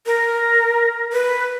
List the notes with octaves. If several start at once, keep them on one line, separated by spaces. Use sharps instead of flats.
A#4
B4